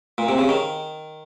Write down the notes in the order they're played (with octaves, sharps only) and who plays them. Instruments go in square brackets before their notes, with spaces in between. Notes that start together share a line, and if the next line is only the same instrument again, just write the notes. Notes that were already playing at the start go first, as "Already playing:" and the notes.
[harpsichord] A#2
C3
C#3
D#3